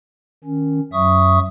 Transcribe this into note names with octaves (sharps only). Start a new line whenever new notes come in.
D#3 C#4
F#2 F#3 E5 C#6 D#6